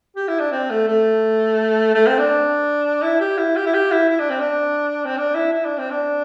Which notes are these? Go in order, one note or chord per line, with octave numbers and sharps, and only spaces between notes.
G4
E4
D4
C4
A3
A3
A3
C4
D4
E4
G4
E4
G4
E4
G4
E4
E4
D4
C4
D4
C4
D4
E4
E4
D4
C4
D4